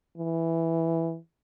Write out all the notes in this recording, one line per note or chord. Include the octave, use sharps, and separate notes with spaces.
E3